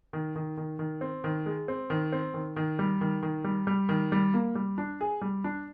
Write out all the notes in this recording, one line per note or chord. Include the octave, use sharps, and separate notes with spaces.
D#3
D#3
D#3
D#3
C4
D#3
G#3
C4
D#3
C4
D#3
D#3
G3
D#3
D#3
G3
G3
D#3
G3
A#3
G3
D4
G#4
G3
D4